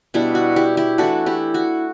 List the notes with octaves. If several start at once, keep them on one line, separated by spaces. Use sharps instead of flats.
B2 G3 D4 E4
F#4
E4 G4
E4 G4
E3 A3 D4 F#4 A4
E4 G4
F#4